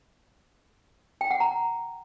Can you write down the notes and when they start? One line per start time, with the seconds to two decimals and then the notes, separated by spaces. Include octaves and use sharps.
1.21 G5
1.31 F#5
1.40 A#5